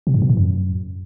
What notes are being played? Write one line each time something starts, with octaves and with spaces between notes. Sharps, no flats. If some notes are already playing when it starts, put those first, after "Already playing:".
C3
G#2
B2
A2
F#2